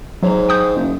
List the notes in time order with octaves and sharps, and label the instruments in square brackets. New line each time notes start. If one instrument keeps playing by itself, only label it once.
[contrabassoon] G#2 [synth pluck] F#3 C#5 A#5
[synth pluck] G5 D#6 G6
[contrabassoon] F#1